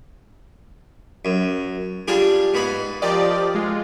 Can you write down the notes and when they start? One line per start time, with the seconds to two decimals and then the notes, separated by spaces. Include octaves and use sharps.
1.25 F#2
2.08 G3 D4 F4 G#4
2.54 G#2 B3 B5
3.02 F3 F4 G4 A#4 D5 D#5
3.55 G#3 F4